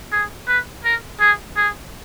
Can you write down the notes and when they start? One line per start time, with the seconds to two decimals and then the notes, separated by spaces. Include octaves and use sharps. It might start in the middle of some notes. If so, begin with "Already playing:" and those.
0.12 G#4
0.48 B4
0.84 A#4
1.20 G#4
1.56 G#4